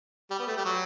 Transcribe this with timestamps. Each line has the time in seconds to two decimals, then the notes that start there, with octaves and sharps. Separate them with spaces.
0.30 G3
0.39 B3
0.47 A3
0.57 G3
0.65 F#3